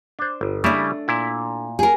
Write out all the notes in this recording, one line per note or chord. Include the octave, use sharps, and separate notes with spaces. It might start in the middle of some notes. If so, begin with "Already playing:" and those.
D4 C5
G1
C#3 G3 A3 D4 E4
A#2 E4
G#4 A#4